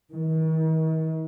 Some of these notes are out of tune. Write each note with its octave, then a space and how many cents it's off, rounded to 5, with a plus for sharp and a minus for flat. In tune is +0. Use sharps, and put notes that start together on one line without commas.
D#3 +45